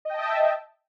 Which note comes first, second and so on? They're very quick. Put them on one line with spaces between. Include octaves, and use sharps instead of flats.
D#5 G5 A5 E5